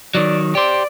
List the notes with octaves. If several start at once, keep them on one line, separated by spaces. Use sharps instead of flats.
D#3 F#3 D5
G4 C5 D5